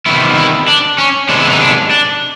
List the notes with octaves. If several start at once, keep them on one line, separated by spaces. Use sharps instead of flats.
C3 D#3 G3 B3 E4
E4
D4
C#4
C3 D#3 G#3 B3 D4
E4
D#4
D4
D4